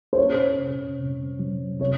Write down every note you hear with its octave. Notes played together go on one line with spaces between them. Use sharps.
C5
C#4 C#5
C3
C3
F#3
C3 C#5